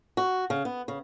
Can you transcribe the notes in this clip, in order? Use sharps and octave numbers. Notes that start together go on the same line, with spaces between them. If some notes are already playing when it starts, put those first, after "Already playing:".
F#4
C#3
B3
C#3